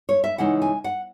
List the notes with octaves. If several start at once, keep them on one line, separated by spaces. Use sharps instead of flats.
C#5
E5
C#3 E3 G#3 D#4 F#5
G#5
F#5